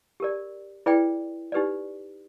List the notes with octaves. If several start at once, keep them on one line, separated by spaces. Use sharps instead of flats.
G4 A#4 D5
E4 G#4 B4 D5 G5
D#4 G4 B4 D5